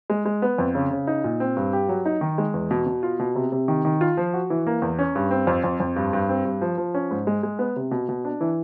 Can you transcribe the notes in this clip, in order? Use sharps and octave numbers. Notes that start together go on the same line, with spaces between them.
G#3
G#3
B3
F2
C#3
C#3
D#4
A#2
C4
G2
G4
F#3
D#4
D#3
G#3
E2
B2
B2
F4
B2
C3
C3
D#3
D#3
F4
F3
F#4
E3
A#3
E2
C#4
G2
C4
F2
F2
F2
G2
G2
C4
G2
F3
F3
C#4
G#2
G#3
G#3
B3
C3
B2
B2
D4
E3